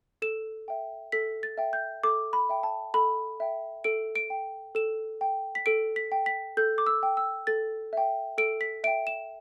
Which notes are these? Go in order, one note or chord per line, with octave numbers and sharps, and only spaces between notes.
A4 E7
E5 G5
A4 B6
A6
E5 G5
G6
A4 D6
B5
E5 G5
A5
A4 B5
E5 G5
A4 D7
D7
G5
A4 E7
G5
B6
A4 D7
B6
G5
B6
A4 G6
D6
E6
G5
E6
A4 A6
E5 G5
A4 D7
B6
E5 G5 D7
E7